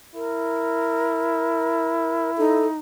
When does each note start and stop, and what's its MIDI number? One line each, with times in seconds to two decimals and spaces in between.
0.15 2.71 64
0.15 2.31 70
2.38 2.79 63
2.38 2.67 69